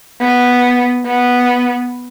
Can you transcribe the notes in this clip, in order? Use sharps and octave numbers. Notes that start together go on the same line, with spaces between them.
B3
B3